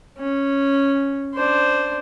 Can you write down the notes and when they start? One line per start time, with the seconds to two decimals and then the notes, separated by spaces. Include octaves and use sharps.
0.18 C#4
1.35 D4 C5